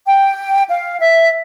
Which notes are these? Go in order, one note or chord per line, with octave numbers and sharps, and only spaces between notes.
G5
F5
E5